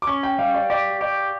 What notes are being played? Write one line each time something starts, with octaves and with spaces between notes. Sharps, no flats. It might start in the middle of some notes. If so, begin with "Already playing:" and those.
D6
C#4 C#6
G5
G3 F5
D5
G4 D5
G4 D5